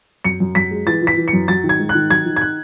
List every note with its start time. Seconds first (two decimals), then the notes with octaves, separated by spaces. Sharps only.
0.24 F#2 C#7
0.40 F#2
0.55 F#2 B6
0.71 G#3
0.87 E3 A6
1.02 E3 B6
1.17 E3
1.28 C#7
1.33 F#2
1.48 F#3 A6
1.64 D#3
1.69 G#6
1.80 G#2
1.89 F#6
1.95 D#3
2.10 F#3 G#6
2.26 D#3
2.36 G#6
2.41 F#6